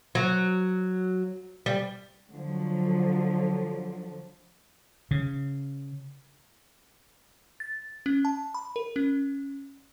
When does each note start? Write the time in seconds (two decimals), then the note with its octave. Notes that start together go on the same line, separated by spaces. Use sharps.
0.15 F#3
1.66 G3
2.33 D3 F3 F#3
5.11 C#3
7.60 A6
8.06 C#4
8.25 A5
8.54 B5
8.76 A#4
8.96 C#4